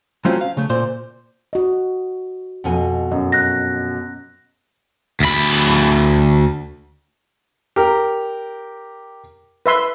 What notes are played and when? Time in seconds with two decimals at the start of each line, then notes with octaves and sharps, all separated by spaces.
0.25 F#3 A3 C4 C#4 F4
0.41 F5
0.57 C#3 A3
0.70 A#2 C5
1.53 F#4 D#5
2.64 F2 B2 G#5
3.11 F#2 D#5
3.32 F#6 A#6
5.20 D2 B5
7.76 G4 A#4
9.66 B4 E5 C6